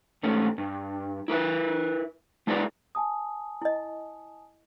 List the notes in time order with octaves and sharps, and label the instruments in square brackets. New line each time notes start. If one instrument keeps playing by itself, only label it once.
[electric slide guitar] G#2 A3 C#4
G2
E4 A#4 B4 E5
G#3 D4 E4 G#4 B4 D5
[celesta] G#5 A5 D#6
[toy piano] E4 D#5